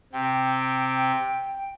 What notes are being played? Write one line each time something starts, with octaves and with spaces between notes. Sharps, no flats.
C3 G5